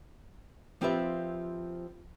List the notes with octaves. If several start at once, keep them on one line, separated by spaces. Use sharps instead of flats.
F3 C4 F4 G4 B4 E5